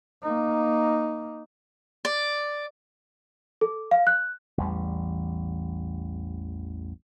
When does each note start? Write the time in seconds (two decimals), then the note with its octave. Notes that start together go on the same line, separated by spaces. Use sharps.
0.22 A#3 D#4
2.05 D5
3.61 A4
3.91 F5
4.07 F#6
4.58 A1 E2 G3